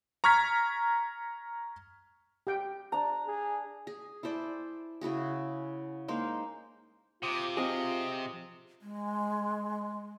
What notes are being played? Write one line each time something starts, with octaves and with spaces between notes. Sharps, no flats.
A#5 C#6 F6 G#6 B6
G4 G5
D4 A#5
G#4
G#4
E4 A4 C5 D5
C#3 E4 F#4 G#4
G#3 A#3 D#4 C5
C3 F4 D6 D#6
F3 C4 G#4 D#5
G#3